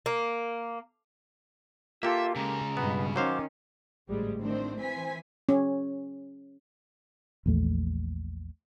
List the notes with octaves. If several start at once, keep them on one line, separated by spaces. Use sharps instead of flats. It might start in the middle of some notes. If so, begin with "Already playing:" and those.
A#3
A#3 F4 G4 A4 E5
C#3 G#3 A#5
G2 B2 B3
D#3 F#3 C#4 C5 F5 D6
A1 D2 G#2 F3 G3 G#3
A2 D#3 C4 D4 C5
E3 C4 C5 G#5 B6
C#4
A#1 E2 A3